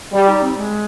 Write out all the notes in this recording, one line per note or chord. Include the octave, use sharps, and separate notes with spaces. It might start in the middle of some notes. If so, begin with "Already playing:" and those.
G3 G4
D#4
C4
G#3